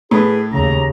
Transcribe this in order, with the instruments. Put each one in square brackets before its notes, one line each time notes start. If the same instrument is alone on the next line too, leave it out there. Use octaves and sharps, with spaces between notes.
[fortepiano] A2 [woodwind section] E4 G#4 B4
[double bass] D#2 C#3 [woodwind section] A#5